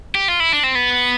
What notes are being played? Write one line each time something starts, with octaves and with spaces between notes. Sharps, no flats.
G4
F4
E4
D4
C4
B3